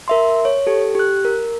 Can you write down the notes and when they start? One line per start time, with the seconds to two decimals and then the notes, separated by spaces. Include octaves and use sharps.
0.08 A#4 E5 C6
0.45 C#5
0.67 G4 A4
0.95 G4 F#6
1.25 A#4